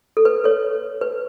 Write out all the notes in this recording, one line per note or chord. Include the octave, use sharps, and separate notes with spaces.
A4
B4
A4 C#5
B4